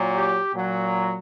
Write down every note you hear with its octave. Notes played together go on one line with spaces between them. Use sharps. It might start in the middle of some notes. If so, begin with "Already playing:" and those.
Already playing: A#2 F#3
G4
A#2 F#3